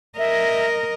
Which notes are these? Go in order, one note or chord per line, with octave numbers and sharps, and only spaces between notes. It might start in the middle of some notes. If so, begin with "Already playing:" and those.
A#4 D#5 E5